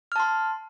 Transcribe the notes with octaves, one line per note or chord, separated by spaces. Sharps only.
A5 C6 F6